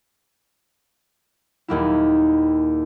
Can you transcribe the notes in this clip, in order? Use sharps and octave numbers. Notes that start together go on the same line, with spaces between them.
D#1 D#2 A#3 E4